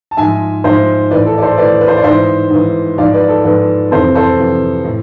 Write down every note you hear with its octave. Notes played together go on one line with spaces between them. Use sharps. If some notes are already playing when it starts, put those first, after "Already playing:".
A5
G#2 F3 E5 G#5
G#2 F3 C5 E5
A2 E3 B4 D5
A4
D5
A4 C5
A2 E3 B4 D5
B4
C5
D5
G#2 C5 E5
E3
G#2 E3
G#2 F3 D5 F5
B4 D5
A4
G#2 F3 B4
F2 C3 E3 A4 C5
A4 C5
F2 C3 E3
A2